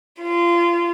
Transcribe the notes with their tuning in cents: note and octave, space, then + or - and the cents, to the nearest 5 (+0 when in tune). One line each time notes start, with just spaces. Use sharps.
F4 -25